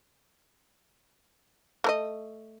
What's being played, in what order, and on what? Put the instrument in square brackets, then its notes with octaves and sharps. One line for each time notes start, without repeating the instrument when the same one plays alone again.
[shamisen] A3 A#4 D#5